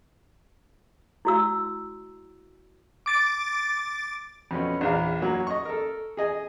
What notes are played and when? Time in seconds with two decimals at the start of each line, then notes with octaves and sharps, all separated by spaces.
1.25 E4 F#4 E6
3.06 D6 A6 D7
4.51 F2 B2 B3 C#4
4.81 A#1 E2 F5
5.21 F#2 F#3 A#3
5.47 D#5 C#6
5.65 A4 A#4
6.17 G#4 D#5 G#5